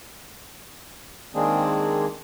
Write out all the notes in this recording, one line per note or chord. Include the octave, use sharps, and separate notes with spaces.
D#3 G#3 A#3 C4 D4 G#4